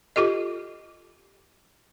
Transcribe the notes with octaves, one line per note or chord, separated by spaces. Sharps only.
F4 G4 A4 D#5